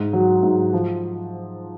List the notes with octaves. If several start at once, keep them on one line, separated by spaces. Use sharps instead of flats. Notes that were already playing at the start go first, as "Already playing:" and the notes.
Already playing: G#2
F#3
G#2
F3